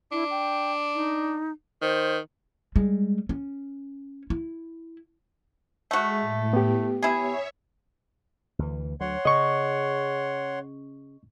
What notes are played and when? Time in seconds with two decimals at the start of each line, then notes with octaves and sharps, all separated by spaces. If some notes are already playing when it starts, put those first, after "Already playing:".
0.12 D4 E4
0.31 G5
0.95 D#4
1.82 D#3 C5
2.76 G3 G#3
3.29 C#4
4.30 E4
5.91 G#3 A3 F#4 E5
6.20 A2
6.53 B3 G4
7.03 E4 G#4 C#5 E5
8.59 D2 E3
9.00 D2 F#3 C#5 F#5 C6
9.25 C#3 D#5 C#6